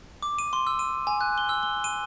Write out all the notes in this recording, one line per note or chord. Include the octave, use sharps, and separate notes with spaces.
D6
D#7
C6
E6
D#7
G#5
F#6
G7
E6
G7
D#7